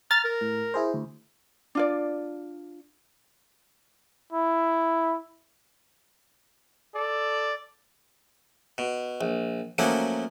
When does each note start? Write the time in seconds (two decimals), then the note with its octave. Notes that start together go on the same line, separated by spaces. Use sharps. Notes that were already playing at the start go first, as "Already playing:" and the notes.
0.11 A#5 F6 A6
0.24 A#4
0.41 A2
0.74 E4 G#4 C5
0.94 D2
1.75 D4 F4 D5
4.32 E4
6.93 A4 D5
8.78 B2
9.21 A#1
9.78 F3 F#3 A3 A#3 C#4